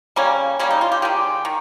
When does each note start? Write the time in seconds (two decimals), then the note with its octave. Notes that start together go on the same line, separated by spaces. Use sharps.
0.16 C#3 G3 A#3 C#4
0.59 C#3 G3 A#3 C#4
0.71 D#4
0.81 F4
0.92 G4
1.02 D#3 G#3 G4
1.45 D#3